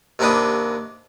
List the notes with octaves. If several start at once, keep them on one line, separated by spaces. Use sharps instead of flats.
D#2 C3 A#3 D4 B4 D#6